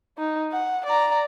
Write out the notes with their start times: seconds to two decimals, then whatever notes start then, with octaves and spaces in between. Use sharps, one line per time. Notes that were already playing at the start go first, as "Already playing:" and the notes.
0.18 D#4
0.52 F#5
0.86 D5 A#5